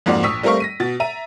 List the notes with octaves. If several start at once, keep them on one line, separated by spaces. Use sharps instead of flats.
F2 G#2 A#3 F#4 D5
A#1 C#6 D#6 E6 B6
G3 A3 C4 A#4 F5 C#6
A#6 B6 D#7
B2 A6
E5 A#5 D#7